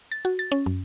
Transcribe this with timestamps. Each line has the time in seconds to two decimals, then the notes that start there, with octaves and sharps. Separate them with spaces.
0.12 A6
0.25 F#4
0.39 A6
0.52 C#4
0.66 F#2